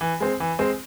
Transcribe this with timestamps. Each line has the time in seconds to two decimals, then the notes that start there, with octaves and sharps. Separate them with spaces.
0.01 E3
0.21 G#3 C4
0.40 E3
0.59 G#3 C4